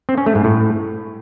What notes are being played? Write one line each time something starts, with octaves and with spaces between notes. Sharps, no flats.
C4
C#4
A3
G#2
A2